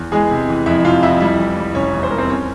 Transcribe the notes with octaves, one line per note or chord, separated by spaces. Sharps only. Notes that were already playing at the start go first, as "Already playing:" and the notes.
Already playing: E2
E3 G#3 G#4
C3
E3
F2 E4 E5
C3 F4 F5
F2 E4 E5
G3 E4 E5
E3
G3
F1 C#4 C#5
E2
C5
G3 A#4
C4 C5
C#4 C#5